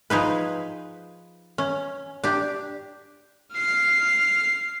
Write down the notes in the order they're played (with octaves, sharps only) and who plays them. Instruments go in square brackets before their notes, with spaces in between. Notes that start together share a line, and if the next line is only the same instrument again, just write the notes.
[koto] F3 D#4 G#4 B4
C#4
D4 G4
[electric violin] F6 C7